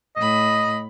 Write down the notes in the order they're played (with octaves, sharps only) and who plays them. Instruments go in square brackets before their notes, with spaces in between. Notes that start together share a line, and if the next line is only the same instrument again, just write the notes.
[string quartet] A2 B5 [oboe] D#5